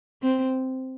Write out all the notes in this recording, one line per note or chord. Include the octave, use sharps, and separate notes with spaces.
C4